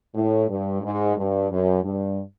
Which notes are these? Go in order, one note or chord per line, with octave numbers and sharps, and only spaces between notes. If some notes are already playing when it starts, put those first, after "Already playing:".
A2
G2
G#2
G2
F#2
G2